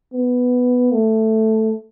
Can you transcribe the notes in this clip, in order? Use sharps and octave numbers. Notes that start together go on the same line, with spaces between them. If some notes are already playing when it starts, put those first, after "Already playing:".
B3
A3